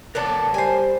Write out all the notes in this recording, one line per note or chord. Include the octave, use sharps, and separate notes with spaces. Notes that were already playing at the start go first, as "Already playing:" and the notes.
B3 D4 A4 A#4 C#5 A5
G3 C5 G#5